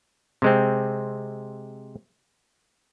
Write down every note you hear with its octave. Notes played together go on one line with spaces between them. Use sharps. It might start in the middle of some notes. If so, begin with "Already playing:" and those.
C3 G#3 C4